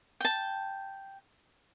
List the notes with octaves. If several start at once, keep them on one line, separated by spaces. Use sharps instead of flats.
G5 A5